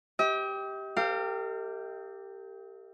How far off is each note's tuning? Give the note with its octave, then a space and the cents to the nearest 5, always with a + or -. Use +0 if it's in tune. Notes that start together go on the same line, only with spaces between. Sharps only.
G4 +0 D#5 +45
G4 +0 A#4 -45 F5 -10